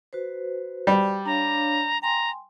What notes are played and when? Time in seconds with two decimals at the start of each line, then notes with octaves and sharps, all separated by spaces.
0.13 F#4 B4 C5
0.87 G3
1.26 D4 C#5 F5 A#5
2.02 G5 G#5 A#5 C6